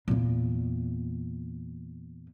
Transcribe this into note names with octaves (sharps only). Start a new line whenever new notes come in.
E2 A#2